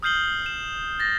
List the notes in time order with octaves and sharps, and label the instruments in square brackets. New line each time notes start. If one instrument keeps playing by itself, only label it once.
[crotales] D#6 F6 G6 C7 F#7 G7
E7
A6 A#6